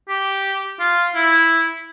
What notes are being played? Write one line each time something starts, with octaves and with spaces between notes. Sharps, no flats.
G4
F4
E4